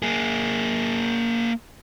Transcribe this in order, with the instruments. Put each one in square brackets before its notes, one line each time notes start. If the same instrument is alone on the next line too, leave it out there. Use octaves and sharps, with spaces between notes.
[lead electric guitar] A#3 G#4